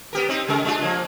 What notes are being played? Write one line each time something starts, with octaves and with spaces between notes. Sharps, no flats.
B3 G4 A#4
C4 D#4
C#3 G#3 A#4
G#3 D4 F4
F3 A#3